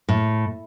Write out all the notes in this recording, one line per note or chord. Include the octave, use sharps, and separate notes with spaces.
A2